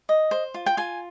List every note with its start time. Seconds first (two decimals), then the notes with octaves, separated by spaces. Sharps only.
0.09 D#5
0.31 C5
0.54 F4
0.66 G5
0.77 F4 G#5